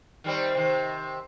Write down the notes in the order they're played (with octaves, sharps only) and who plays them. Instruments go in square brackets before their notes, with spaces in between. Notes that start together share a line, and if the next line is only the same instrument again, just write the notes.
[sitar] D#3 G3 C4
C3 D#3